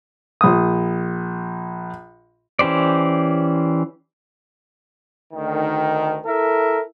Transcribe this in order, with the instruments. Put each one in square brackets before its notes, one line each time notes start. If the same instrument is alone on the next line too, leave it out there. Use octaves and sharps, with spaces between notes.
[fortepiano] A#1 D#6
[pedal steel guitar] E3 C#4 G4 C5 D5
[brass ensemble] D2 D#3
E4 A4 A#4 E5